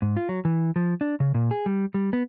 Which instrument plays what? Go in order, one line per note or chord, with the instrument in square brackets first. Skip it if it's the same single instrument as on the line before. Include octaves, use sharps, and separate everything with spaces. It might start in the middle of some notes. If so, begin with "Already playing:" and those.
[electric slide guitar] G#2
F4
F#3
E3
F3
D4
C#3
A#2
G#4
G3
G3
B3